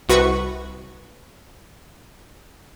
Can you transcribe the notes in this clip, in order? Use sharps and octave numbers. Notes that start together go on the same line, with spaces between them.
C2 F#4 B4 C#6